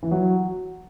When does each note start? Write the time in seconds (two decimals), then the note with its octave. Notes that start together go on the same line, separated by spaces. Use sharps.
0.03 E3
0.11 F#3